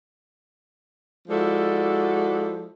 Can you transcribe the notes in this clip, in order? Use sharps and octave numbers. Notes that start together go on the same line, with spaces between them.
F3 G#3 E4 F#4 A4 D5